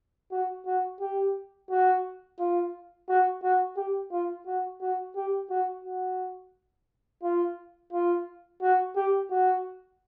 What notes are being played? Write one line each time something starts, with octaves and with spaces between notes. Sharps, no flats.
F#4
F#4
G4
F#4
F4
F#4
F#4
G4
F4
F#4
F#4
G4
F#4
F#4
F4
F4
F#4
G4
F#4